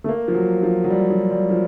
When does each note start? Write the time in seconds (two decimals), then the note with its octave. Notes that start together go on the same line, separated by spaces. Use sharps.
0.04 A3
0.08 A#3
0.28 F3
0.35 F#3
0.63 F3
0.84 F#3
0.90 G3
1.11 F#3
1.31 G3
1.50 F3